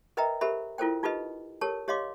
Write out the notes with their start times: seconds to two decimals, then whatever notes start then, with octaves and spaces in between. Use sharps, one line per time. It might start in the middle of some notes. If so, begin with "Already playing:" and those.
0.17 A#4 B4 D#5 E5 G5 A#5
0.41 G4 A4 A#4 C5 E5 B5
0.78 E4 F4 A4 A#4 C5 G5
1.03 D#4 F4 G4 A4 B4 D#5
1.61 G4 A4 A#4 C#5 A5
1.88 G4 C#5 D#5 F5 C6 D6